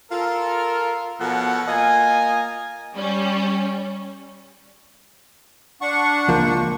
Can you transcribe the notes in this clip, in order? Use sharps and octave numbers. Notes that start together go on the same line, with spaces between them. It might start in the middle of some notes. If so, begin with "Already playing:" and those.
F4 A4 A#4
B2 F3 A4 A#4 C#5 F#5
A#3 F4 D#5 G#5
G3 C#4
D4 F#5 C#6
C#2 F3 A#3